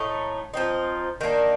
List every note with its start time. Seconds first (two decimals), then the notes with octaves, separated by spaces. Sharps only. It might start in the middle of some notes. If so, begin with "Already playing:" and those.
Already playing: A2 A3 D#4
0.54 F3 C4 D#4
1.21 D#3 A#3 D4